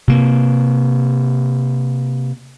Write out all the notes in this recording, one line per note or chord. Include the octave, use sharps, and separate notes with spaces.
C3 A#3